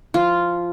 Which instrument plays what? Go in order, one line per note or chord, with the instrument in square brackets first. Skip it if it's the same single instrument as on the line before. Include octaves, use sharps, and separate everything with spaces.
[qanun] F3 F4